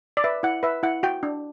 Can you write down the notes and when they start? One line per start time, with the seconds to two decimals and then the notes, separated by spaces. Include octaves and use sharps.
0.17 D5
0.24 B4 E5
0.43 E4 F#5
0.63 B4 E5
0.83 E4 F#5
1.03 F#4 G5
1.23 D4